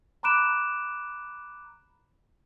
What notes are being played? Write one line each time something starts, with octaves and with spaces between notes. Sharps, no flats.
A#5 B5 D6 F#6 D7 E7